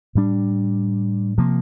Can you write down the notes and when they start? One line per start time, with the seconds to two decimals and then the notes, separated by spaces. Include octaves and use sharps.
0.15 A2 G3 D4
1.38 C3 F3 A#3